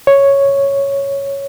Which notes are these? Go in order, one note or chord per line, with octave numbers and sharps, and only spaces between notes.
C#5